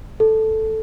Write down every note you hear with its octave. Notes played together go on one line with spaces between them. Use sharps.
A4